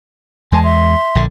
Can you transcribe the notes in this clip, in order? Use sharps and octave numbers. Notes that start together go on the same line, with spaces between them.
E2 G#3 G#5 A5 C6
E5 C6
A#1 D3